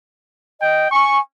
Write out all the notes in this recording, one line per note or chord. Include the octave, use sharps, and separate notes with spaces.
D#5 G5
G#5 C#6